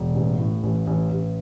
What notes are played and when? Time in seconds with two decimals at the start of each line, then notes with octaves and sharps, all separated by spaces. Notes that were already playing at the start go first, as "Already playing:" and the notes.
Already playing: E1
0.15 A1
0.39 A2
0.63 A1
0.87 A1
1.11 A1